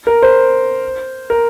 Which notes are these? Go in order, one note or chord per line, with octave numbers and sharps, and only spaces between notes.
A#4
C5
A#4